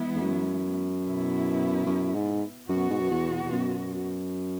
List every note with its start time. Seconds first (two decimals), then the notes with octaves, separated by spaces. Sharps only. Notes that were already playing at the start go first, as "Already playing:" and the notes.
Already playing: E3 G#3 B3 E4
0.16 E2
0.22 F#2
1.05 B2 B3 E4
1.86 F#2
2.15 G#2
2.69 F#2 B2 B3 F#4
2.90 G#2
3.00 F#2
3.11 E2
3.43 E2
3.52 F#2